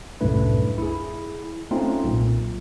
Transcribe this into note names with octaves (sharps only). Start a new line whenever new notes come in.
C2 F#2 A2 A3 D4 B4
E4 G#4
A3 C4 C#4 D#4 F4
B1 A#2